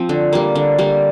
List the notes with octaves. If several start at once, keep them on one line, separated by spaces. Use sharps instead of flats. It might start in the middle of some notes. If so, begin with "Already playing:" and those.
Already playing: F3 C4
D3
G3 A#3
D3
G3 A#3